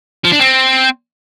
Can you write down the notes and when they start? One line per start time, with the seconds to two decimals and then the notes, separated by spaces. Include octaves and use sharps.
0.24 F3
0.32 D4
0.40 C4